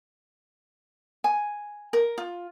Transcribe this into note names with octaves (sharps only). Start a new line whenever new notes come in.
G#5
A#4
F4